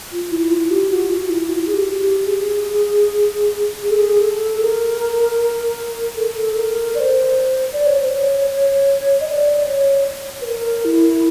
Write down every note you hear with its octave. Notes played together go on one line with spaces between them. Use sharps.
F4
E4
F4
G4
F#4
F4
E4
F#4
G#4
G4
G4
G#4
G#4
A4
G#4
A4
A#4
A4
A#4
D5
C5
D5
C#5
C5
C#5
C#5
D#5
D5
C#5
B4
A#4
E4